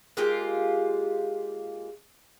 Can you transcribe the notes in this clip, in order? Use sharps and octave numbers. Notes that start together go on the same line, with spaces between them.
G#3 A#3 F4 G4